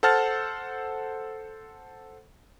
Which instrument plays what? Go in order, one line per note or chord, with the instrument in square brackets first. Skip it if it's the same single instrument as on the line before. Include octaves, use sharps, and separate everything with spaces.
[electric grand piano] A4 C5 F#5 A5 F6 A6